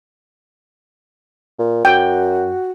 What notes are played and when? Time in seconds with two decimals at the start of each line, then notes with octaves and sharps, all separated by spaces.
1.59 A#2
1.85 F#2 F#4 G5